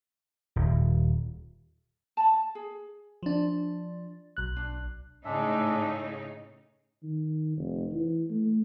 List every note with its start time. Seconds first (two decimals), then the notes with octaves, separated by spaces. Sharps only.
0.56 D#1
2.17 A5 B5
2.55 G#4
3.23 F3 D4
4.37 B1 F#6
4.56 D4
5.25 A2 C#3 G#3 D4 D#4 E5
7.03 D#3
7.57 F1
7.92 E3
8.30 A3